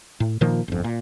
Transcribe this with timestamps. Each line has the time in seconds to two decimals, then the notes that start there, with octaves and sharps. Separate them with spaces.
0.20 A2
0.41 A#2 D#3 F3 A#3
0.68 G1 F2
0.84 A#2